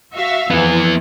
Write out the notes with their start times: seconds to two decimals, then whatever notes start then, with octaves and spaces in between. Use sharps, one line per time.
0.15 F#4 E5 F5
0.51 F2 E3 B3 E4